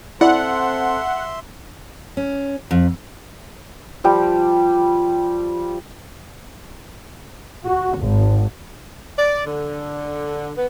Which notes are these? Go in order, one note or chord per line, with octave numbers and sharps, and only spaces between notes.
C4 E4 A4 C5 D5 E5 F#5 C6
C#4
F2
F3 G3 G5
F#4
G#1
D5
D3
B3